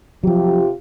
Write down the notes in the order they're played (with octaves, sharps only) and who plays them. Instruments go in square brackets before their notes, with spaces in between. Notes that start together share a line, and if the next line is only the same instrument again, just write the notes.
[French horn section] C3 F4 G4 [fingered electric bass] F3 F#3